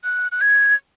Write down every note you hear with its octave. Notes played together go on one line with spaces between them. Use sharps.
F#6
F#6
G#6